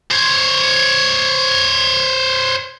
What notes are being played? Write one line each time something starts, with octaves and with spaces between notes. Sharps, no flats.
C5 C#5